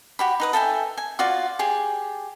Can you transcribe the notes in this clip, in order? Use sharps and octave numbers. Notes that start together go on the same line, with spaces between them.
F#4 G4 B5
D#4 B4 D#6
A4 E5 G5 G#5
G#5
F4 F#4 D5 F5
G4 G#4